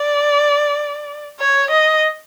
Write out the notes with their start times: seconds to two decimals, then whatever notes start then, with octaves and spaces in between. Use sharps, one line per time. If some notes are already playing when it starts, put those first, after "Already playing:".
Already playing: D5
1.40 C#5
1.71 D#5